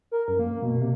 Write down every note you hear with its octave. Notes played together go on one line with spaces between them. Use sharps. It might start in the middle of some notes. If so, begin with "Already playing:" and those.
A#4
F#2
A#3
B2
C3